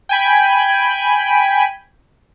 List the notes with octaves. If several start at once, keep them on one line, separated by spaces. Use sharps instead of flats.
G5 G#5 B5